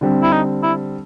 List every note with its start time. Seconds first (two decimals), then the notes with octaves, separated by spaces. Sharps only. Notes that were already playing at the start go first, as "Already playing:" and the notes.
0.01 D3 G3 C4
0.22 E4
0.32 D#4
0.63 E4